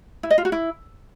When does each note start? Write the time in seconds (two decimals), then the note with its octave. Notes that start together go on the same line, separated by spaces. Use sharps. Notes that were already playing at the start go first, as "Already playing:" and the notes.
0.23 E4
0.31 D#5
0.38 F4
0.45 F#4
0.52 E4